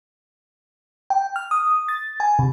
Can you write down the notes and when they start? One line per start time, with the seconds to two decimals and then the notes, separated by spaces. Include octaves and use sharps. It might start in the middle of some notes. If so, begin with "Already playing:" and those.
1.10 G5
1.36 F6
1.51 D#6
1.88 A6
2.20 G#5
2.39 C3